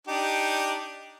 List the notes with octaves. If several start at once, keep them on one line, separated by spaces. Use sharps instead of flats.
D4 D#4 G4